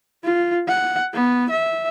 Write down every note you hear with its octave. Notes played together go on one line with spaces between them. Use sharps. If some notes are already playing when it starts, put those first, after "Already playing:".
F4
F#5
B3
E5